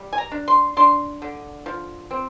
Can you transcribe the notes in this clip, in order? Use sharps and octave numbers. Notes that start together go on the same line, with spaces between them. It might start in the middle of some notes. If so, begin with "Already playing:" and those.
Already playing: G3
G#5
A#5
D4
C6
D4 C6
D3
F3
C4